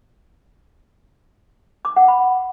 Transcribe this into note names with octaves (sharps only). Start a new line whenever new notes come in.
D6
F#5
B5